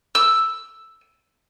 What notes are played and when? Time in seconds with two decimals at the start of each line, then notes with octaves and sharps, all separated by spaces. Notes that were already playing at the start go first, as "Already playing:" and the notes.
0.15 E6